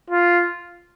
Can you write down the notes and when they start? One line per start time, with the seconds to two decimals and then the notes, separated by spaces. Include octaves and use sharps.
0.11 F4